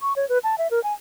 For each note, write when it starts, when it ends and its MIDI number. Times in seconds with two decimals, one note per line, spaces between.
0.01 0.13 85
0.16 0.28 73
0.29 0.38 71
0.44 0.55 81
0.58 0.68 76
0.71 0.82 70
0.84 0.93 80